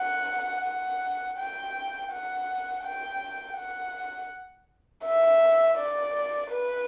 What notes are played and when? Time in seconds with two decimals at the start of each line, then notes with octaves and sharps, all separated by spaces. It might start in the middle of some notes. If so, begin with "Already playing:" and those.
Already playing: F#5
0.65 F#5
1.38 G5
2.12 F#5
2.84 G5
3.58 F#5
5.04 E5
5.78 D5
6.51 B4